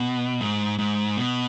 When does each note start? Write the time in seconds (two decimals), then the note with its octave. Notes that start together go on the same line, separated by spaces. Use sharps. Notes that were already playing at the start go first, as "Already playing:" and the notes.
Already playing: B2
0.41 G#2
0.78 G#2
1.17 B2